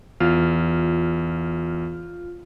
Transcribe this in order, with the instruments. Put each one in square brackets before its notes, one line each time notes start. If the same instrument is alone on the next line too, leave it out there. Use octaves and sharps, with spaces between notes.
[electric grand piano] E2 [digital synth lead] F4